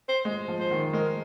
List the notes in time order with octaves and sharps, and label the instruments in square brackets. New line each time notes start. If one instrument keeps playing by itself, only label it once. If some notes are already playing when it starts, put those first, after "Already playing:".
[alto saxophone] C5
[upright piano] G#3
F3
[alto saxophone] C5
[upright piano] D#3
[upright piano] G#3 [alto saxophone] A#4